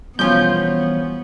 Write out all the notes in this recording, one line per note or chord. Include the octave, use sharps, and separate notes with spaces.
E2 G2 B2 F3 B3 C#4 F4 G6